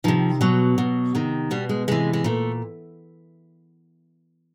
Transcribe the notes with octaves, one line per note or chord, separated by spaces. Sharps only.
C3 D#3 F3
B2 F#3
B2
C3 D#3
B2 G3
G#3
C3 E3 G#3
G#3
A#2 A3